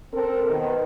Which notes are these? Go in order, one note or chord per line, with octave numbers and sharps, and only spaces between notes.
C4 A4 A#4
B2 D#3 B4